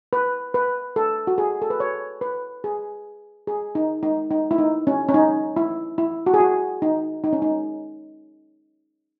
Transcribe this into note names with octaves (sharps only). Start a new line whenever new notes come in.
B4
B4
A4
F#4
G#4
A4
B4
C#5
B4
G#4
G#4
D#4
D#4
D#4
E4
D#4
C#4
C#4
D#4
E4
E4
F#4
G#4
F#4
D#4
D#4
C#4
D#4